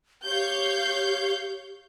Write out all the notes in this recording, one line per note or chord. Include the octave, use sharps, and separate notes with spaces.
G4 C#5 F5 G6